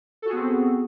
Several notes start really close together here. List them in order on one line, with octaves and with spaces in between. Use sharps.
A4 F#4 G#4 B3 C4